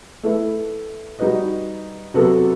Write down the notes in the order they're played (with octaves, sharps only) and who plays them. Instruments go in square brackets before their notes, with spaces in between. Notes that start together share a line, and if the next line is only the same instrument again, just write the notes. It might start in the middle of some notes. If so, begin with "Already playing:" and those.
[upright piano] A3 E4 B4
G3 D#4 F#4 B4 D#5
C3 F#3 B3 F#4 A4